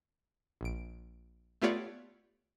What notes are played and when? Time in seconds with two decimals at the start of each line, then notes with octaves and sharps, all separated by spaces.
0.61 A#1 D7
1.62 A3 B3 F4 G4 C#5 D5